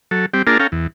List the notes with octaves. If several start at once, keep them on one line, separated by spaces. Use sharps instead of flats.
F#3 A4
G3 C4 G4
A#3 D4 F4 G#4 A#4 A5
C#4 A4 F5 G5 A#5
E2